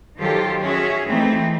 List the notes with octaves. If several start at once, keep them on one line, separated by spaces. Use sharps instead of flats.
D#3 F#3 F4 G4 A4 C5
C#4 F#4 G#4 E5
E3 A3 C4 D#4